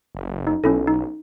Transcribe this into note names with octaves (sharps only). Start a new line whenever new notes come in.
F#1
D#4
B1 C#4 E4 A4
D#4